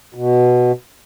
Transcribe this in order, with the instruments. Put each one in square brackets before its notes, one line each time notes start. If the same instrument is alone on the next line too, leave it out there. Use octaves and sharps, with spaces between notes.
[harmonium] B2